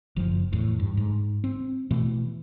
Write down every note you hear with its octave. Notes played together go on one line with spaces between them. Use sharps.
F#1 F3
E2 A2
G2
G#2
C4
B2 E3 A3